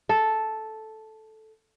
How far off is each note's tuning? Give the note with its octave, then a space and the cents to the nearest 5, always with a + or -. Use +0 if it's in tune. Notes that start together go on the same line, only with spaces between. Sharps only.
A4 -5